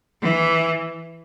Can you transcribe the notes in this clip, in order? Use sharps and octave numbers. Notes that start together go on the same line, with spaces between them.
E3